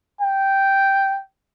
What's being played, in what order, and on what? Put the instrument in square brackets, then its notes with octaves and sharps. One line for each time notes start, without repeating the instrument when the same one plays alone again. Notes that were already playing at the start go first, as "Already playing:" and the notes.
[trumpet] G5